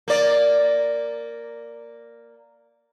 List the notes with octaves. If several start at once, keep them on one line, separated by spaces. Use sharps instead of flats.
A#3 D5